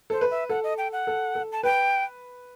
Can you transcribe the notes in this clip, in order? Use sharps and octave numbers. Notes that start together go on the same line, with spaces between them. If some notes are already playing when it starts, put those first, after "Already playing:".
A4 C5
B4
E5
A4 F#5
D#5
G5
F#5
A4
A4
A5
B4 G5